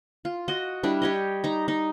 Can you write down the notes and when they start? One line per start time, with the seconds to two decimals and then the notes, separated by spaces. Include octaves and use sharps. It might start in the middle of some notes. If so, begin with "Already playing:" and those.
0.25 F4
0.48 F#4 D#5
0.83 G3 D4 E4
1.02 G4 C#5 D#5
1.44 D#4 A#5
1.68 D#4